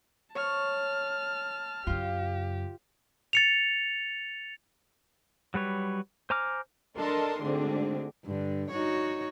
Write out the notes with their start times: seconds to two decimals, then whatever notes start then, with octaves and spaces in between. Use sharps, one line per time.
0.35 C#5 A5 F6
1.87 F#2 C#3 F4 G4
3.33 A6 C#7 F7
5.54 F#3 G3 B4 C#5
6.30 C5 G#5 A#5 D6 F6
6.96 D4 A4 A#4 D#5 A5 C6
7.42 D2 G#2 D3 C4 D4
8.25 G2 D3
8.70 D#4 F#4 C#5